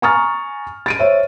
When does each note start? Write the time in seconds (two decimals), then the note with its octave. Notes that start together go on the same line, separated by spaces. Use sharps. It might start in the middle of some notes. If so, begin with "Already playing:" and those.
0.02 G#5 A#5 C#6 D#6 F6 A6
0.86 A6 D7 D#7
0.99 C5 C#5 E5